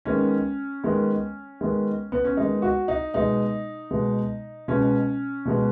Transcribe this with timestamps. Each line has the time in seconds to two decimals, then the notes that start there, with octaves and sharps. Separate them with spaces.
0.05 D#3 G#3 B3 C#4
0.83 D#3 G#3 B3
1.61 D#3 G#3 B3
2.12 B3
2.24 C#4
2.37 D#3 G#3 B3 D#4
2.62 F#4
2.88 D#4
3.14 B2 G#3 B3 D#4
3.91 B2 G#3 B3
4.68 B2 G#3 B3 C#4
5.45 B2 G#3 B3